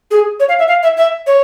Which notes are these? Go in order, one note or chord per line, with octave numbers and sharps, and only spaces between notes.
G#4
C#5
F5
E5
F5
E5
E5
C#5